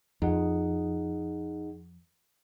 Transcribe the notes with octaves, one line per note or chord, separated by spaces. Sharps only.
F2 D#4 G#4 F#5